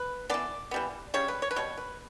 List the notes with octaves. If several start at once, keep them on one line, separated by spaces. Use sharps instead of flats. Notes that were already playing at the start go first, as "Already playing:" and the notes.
Already playing: B4
E3 B3 D5
E3 G3 B3
C#3 G3 C#5
B4
C#5
B4
B2 G3 C#5
B4